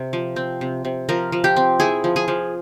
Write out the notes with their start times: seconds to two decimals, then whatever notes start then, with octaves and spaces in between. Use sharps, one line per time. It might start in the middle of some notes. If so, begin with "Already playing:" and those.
Already playing: C3
0.13 F3
0.36 C4
0.61 C3
0.85 C3
1.09 F3 A#4
1.32 F3
1.44 G4
1.56 C4
1.80 E4 G#4
2.04 F3
2.16 G#4
2.28 F3